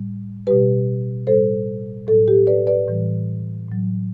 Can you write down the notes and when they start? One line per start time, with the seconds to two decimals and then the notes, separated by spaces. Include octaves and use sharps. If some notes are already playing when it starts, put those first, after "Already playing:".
Already playing: A2 G3
0.47 B2 G3 G4 B4
1.27 A2 G3 A4 C5
2.07 A2 F#3 A4
2.28 G4
2.47 B4 D5
2.67 B4 D5
2.88 A2 E3 G3
3.68 A2 F#3